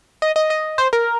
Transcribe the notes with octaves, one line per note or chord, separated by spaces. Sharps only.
D#5
D#5
D#5
C5
A#4